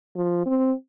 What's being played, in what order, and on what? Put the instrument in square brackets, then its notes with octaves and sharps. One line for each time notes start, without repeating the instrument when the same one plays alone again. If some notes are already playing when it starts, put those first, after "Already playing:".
[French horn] F3
C4